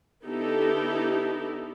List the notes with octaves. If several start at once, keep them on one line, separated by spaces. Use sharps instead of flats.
D3 B3 D#4 E4 G4 A4